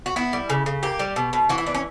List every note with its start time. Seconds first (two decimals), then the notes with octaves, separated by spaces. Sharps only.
0.06 F#4
0.16 B3 E4
0.33 G3
0.50 C#3
0.66 C#3
0.83 A#3 G4
0.99 G3
1.16 B2
1.33 B2
1.49 E3 F#4
1.58 E4
1.66 B3 D4
1.74 C#4